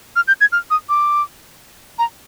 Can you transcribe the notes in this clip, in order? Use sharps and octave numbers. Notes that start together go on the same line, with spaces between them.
F6
G6
G#6
F6
D#6
D6
A#5